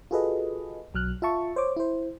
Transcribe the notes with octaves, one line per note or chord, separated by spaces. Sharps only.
F4 F#4 G#4 A4 B4 D#5
B1 F#3 F6 F#6
F4 E5 A5 C#6
C5 C#5 D6
E4 C5